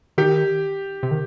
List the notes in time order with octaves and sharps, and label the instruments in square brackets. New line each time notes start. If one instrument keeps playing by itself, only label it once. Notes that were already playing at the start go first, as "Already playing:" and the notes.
[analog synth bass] D#3 [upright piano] G4
[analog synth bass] C3
D#3